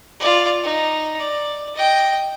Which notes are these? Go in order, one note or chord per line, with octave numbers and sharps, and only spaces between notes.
F4 D5
D#4
D5
D#5 G5